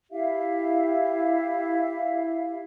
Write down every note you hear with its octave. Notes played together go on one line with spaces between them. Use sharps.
E4 G4 E5 F5